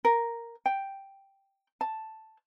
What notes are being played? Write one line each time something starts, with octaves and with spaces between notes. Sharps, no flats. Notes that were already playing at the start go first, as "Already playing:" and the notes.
A#4
G5
A5